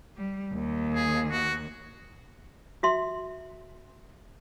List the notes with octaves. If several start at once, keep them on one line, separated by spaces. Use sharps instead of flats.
G3
D#2
G#4
F#4
F#4 E5 C6